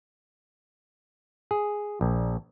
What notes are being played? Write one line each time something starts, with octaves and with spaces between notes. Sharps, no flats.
G#4
A#1